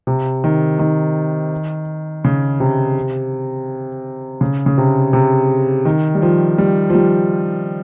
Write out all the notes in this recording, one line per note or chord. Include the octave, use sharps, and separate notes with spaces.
C3
D#3
D#3
C#3
C3
C#3
C#3
C3
C3
D#3
G3
F3
G3
F3
G3